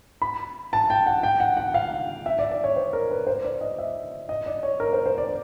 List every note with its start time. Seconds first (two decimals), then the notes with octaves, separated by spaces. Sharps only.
0.22 B5
0.73 A5
0.90 G5
1.06 F#5
1.23 G5
1.40 F#5
1.57 F#5
1.74 F5
2.26 E5
2.39 D5
2.51 D5
2.64 C#5
2.76 C5
2.93 A#4
3.11 B4
3.27 C5
3.45 D5
3.61 D#5
3.78 E5
4.29 D#5
4.46 D5
4.63 C#5
4.80 A#4
4.93 C5
5.06 C5
5.18 D5